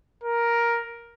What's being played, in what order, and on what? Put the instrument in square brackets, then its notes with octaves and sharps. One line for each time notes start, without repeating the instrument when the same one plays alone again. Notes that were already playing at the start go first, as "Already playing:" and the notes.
[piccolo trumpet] A#4